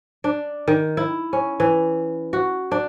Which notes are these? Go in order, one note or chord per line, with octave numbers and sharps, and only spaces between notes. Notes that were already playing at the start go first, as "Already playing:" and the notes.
D4
D#3
E4
C#4
E3
F#4
D4